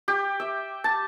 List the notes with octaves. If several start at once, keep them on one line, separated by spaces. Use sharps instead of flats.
G4
E5
A5